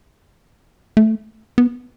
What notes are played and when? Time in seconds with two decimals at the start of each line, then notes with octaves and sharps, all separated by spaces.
0.97 A3
1.58 B3